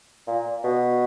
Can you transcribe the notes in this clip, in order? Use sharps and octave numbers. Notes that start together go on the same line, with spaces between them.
A#2
B2